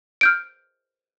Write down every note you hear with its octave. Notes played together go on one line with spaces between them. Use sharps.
F6 G6 D7